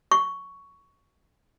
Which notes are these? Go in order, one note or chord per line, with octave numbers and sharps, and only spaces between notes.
C#6